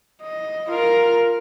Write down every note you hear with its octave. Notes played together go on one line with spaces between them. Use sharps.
D#5
F4 A#4